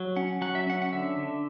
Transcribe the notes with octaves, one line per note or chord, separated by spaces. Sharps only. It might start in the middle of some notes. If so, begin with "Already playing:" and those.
Already playing: F#3
C#4 F#5
F#3 F#5
E5
C#4 F#5
F#5
D3 E5
D3